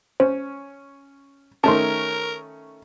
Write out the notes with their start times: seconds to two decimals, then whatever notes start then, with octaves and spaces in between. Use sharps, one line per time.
0.20 C#4 C5
1.64 D#3 A3 C#4 A#4 A5 C6